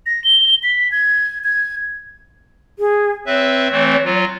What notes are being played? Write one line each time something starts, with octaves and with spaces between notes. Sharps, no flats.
A#6
G7
B6
G#6
G#6
G#4
C4 B4 C#5 E5
E3 A3 C4
F#3 F4